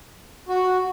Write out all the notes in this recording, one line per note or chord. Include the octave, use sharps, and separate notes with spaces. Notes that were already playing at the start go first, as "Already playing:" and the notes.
F#4